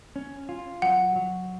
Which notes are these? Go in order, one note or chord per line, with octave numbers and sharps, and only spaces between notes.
C#4
F4
F#3 F#5
F#3